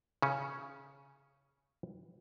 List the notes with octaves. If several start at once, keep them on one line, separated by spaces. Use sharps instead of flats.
C#3 C#4